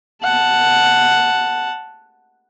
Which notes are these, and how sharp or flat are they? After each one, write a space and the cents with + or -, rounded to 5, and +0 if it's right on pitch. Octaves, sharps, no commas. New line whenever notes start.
F#5 +0 A5 +0